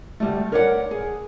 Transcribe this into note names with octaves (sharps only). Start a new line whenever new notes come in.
D2 G3 A3
A#4 B4 C#5 D5 E5 F#5
G#4